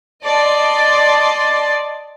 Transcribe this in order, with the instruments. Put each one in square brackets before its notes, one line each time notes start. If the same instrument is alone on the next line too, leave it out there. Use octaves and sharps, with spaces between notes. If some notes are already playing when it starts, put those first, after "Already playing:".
[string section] D5 D#5 A5 C6